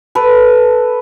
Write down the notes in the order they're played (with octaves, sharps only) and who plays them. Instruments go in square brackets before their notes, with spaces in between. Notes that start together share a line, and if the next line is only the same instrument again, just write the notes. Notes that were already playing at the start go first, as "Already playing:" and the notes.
[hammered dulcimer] A4 B4